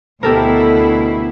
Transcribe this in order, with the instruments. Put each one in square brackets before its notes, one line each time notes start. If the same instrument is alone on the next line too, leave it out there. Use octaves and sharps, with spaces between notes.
[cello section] D2 B2 E4 [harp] G4 A4 A#4